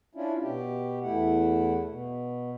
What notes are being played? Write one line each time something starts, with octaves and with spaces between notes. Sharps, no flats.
C#4 D4 E4 F4
B2 G4
E2 A3 E4 F#5
B2